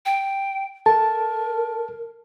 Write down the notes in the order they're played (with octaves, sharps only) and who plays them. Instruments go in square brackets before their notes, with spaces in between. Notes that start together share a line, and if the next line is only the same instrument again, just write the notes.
[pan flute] G5
[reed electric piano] A4 A5 [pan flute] A#4